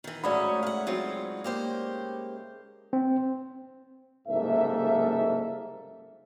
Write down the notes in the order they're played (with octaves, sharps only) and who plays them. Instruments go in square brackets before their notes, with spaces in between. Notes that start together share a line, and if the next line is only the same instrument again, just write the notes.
[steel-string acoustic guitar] D#3 E3
[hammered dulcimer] G#2 C#3 A3 [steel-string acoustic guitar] F#3 C#4 F#4 [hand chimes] D5 B5
[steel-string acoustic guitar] F5 F#5
F#3 C4 F4
A#3 G4 C5
[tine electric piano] C4
[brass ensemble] F#1 C2 G#2 A#3 A4 E5